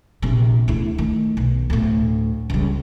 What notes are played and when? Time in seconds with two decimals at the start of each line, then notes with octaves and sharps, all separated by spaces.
0.22 A#1 C3
0.68 D2 E4
0.98 D#3 A3
1.37 B1
1.70 D2 A2
2.50 C#2 G3